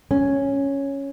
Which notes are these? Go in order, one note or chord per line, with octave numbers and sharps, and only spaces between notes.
C#4